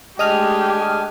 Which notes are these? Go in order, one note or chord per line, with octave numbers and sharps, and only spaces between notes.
G#3 A3 D4 G4 D#5 G#5 D#6 F6